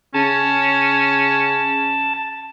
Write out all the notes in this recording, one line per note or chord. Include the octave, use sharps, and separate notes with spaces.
C#3 C#4 A5